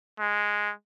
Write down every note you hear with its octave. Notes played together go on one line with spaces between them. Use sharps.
G#3